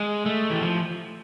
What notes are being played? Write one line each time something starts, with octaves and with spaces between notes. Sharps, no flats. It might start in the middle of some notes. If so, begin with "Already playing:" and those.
Already playing: G#3
A3
E3
F3